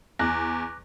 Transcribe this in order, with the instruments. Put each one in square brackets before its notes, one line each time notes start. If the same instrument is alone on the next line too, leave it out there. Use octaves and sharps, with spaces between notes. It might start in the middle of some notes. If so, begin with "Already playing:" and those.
[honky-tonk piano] E2 [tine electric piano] D6 F#6 A#6